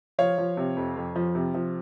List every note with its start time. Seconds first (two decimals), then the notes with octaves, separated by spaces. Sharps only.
0.19 F3 C#5 F5
0.38 F3
0.57 C3
0.77 F2
0.96 F2
1.16 F3
1.35 C3
1.54 F3